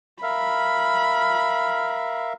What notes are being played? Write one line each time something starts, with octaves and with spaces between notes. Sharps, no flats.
A#4 E5 F5 B5